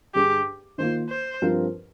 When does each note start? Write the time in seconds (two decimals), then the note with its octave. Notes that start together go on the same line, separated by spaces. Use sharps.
0.14 G2 D3 G3 D4 G4 G#4
0.78 D#3 A#3 F4 C5
1.10 C5
1.42 G2 F3 C4 F4 A#4